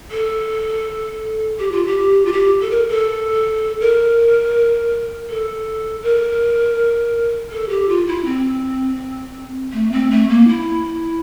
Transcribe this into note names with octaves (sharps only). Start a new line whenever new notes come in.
A4
G4
F4
G4
F4
G4
A4
A#4
A4
A#4
A4
A#4
A4
G4
F4
E4
C4
A3
C4
A3
A#3
E4